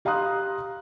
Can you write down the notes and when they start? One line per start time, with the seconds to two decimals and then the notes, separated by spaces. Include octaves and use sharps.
0.05 G4 F5 A#5 C6 D#6 F#6